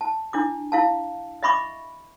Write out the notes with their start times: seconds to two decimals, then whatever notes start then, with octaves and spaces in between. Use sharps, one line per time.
0.01 A5
0.33 D4 E4 D6
0.72 E4 F5 A5
1.43 D#5 E5 B5 C#6 D6